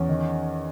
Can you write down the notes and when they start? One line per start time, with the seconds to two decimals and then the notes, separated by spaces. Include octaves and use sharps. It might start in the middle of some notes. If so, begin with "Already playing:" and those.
Already playing: E2 C#4
0.09 D#3